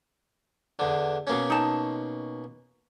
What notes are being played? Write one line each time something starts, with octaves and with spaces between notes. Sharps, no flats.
E2 D3
B2 A#3 C#4
D#4 A5